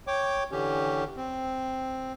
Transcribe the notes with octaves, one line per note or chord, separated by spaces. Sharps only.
C#5 G5 D6
D3 E3 C#4 G4
C4